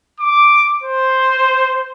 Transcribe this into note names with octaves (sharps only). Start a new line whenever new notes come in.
D6
C5